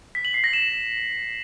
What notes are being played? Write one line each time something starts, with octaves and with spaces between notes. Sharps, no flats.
B6
F#7
C7
A#6
E7